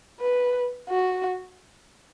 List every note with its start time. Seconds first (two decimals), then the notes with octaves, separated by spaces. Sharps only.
0.20 B4
0.89 F#4